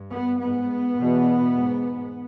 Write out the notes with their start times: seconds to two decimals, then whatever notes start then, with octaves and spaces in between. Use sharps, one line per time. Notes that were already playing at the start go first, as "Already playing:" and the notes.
Already playing: G2
0.13 B3
0.40 G#2 B3
0.98 E2 B2
1.56 G#2